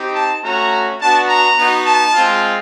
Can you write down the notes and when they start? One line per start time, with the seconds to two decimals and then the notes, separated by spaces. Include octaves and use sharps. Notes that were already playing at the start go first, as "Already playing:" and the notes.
Already playing: C4 D#4 G4
0.14 A5
0.44 A3 C#4 F#4 A#5
1.00 B3 D4 F#4 A5
1.29 A#5
1.57 B3 D#4 F#4
1.86 A5
2.14 G#3 C4 F4